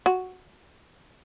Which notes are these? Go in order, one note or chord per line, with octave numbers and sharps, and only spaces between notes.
F#4